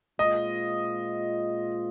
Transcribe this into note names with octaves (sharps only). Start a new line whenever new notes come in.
A#2 G#3 C4 F4 D#5